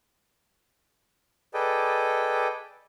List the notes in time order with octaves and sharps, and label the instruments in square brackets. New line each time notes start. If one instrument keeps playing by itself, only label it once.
[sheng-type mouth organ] G#4 A4 B4 D5 D#5 G5